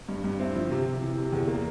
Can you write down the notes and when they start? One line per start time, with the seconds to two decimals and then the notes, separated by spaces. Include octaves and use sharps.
0.09 G2
0.24 G2
0.39 C4 E4
0.55 F3
0.71 C3
0.86 C3
1.02 E3
1.17 C3
1.32 E2
1.48 A#3